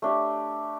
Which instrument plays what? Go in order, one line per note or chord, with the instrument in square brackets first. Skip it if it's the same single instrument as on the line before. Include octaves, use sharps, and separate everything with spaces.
[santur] A3 D4 G4